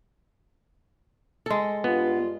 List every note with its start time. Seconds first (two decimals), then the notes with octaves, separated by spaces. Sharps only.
1.46 G#3 A4
1.84 G2 B3 F4